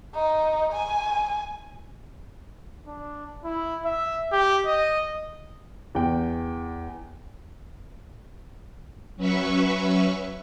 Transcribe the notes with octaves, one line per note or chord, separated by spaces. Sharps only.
D#4
G#5
D4
E4
E5
G4
D#5
E2 G5
F#3 C#4 B4 E5 C#6